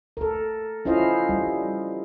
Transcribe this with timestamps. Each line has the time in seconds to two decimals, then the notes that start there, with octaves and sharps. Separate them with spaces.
0.17 A4 A#4
0.85 C#4 E4 F4 C5 D#5 F5
1.29 G3